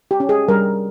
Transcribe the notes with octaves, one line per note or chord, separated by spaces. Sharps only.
G4
C#4
G#4
G3 A#4